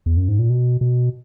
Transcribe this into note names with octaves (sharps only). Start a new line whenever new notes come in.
E2
F#2
G#2
A#2
B2
B2